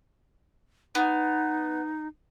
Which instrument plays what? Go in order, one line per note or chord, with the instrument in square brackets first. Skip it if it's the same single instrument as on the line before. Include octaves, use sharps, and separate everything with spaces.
[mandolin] B3 [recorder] D#4